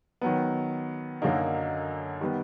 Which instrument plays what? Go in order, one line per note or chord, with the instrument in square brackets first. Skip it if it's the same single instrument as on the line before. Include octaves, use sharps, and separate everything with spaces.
[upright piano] D#3 F#3 B3
F#2 D3 F#3 A#3 D#4
D#3 G3 B3